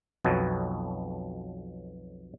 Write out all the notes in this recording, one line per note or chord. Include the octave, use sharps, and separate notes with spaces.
B1 F2 B2 F#3